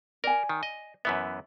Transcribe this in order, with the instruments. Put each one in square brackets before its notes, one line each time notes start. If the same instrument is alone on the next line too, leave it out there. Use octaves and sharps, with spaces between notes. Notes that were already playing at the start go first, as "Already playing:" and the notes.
[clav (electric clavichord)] A#4 [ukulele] D5 G#5
[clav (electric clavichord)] D#3
D#5
[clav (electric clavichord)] F#2 E3 B3 [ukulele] E5